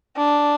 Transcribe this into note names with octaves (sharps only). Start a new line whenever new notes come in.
D4